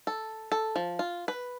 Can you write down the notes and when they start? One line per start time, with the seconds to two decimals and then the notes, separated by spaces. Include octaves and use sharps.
0.07 A4
0.52 A4
0.76 F3
0.99 F4
1.28 B4